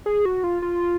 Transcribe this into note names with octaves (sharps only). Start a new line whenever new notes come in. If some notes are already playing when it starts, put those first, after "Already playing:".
G#4
F#4
F4
F4